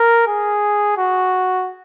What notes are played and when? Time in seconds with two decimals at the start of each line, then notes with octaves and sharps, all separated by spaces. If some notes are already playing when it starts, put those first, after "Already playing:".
Already playing: A#4
0.27 G#4
0.97 F#4